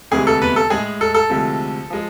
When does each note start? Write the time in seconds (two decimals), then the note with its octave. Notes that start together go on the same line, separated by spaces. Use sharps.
0.11 D2 C3 E3 G#3 G#4
0.27 A4
0.42 B3 B4
0.56 A4
0.70 A2 G#3 G#4
1.01 A4
1.14 A4
1.30 D2 C3 F3 G#3
1.90 F3 G#3